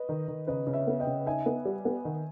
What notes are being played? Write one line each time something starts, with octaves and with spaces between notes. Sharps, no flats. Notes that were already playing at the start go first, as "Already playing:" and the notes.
Already playing: B4 D#5
D#3
D#3
C#3 B4 D#5
C#3
C#5 E5
B3
D#5 G5
C#3
D#4 E5 G#5
B3
G3
B3
D#3